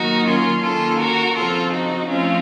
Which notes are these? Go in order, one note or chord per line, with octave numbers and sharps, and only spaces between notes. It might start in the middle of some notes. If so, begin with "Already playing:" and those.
Already playing: D#3 F#3 A#3 D#4 F#4
C#4 F4
D#3 A#3 C#4 F4 A4
F#4 A#4
C#3 F3 C4 F4 A4
D#4 F#4
F3 A3 C4 C#4 F4